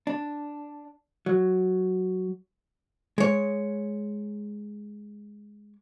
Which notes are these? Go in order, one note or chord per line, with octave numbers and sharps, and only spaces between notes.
D4
F#3
G#3 C#5